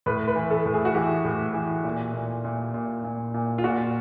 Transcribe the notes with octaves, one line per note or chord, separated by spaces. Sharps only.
A2 B4
B4
E3
A4
A2
G#4
F#4
E3 G4
A2
E3
A#2
A#2
A#2
A#2
A#2
A#2
F4
A#2 F#4